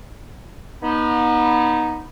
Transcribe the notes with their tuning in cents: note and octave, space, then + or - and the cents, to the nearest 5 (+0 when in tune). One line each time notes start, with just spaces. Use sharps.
B3 -30 D#4 +0 B5 +0